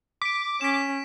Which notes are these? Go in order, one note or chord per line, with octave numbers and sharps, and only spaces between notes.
D6 B6 D7
C#4 B6 E7